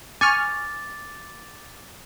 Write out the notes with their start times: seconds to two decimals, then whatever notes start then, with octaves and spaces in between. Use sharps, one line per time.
0.21 G#5 C#6 D6 F6 A6